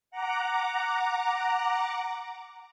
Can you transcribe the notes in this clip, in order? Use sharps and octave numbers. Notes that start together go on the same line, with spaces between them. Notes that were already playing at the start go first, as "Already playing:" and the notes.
F#5 A#5 D6